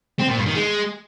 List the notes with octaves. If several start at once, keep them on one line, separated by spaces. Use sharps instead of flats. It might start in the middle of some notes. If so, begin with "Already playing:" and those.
C4
A#2
G2
D#3
G#3